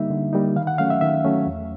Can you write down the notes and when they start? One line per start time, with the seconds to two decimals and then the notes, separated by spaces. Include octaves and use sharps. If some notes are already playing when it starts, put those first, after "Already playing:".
Already playing: D3 G3 A#3 D#4 E5
0.10 D3
0.33 G3 A#3 D#4
0.56 D#3 F5
0.67 F#5
0.78 F#3 A3 C#4 F5
0.90 E5
1.01 D#3 E5
1.24 F#3 A3 C#4
1.46 E2